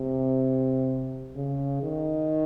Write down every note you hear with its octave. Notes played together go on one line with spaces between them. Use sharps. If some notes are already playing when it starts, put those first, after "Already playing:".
Already playing: C3
C#3
D#3